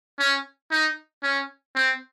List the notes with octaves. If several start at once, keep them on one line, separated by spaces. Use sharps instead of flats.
C#4
D#4
C#4
C4